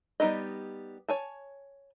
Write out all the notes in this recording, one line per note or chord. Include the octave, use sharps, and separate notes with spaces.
G3 B3 D#4 G4 D#5
C#5 G#5 A5